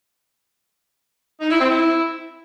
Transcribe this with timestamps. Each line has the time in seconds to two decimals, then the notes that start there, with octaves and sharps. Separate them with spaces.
1.41 D#4
1.50 E4
1.60 C4
1.69 E4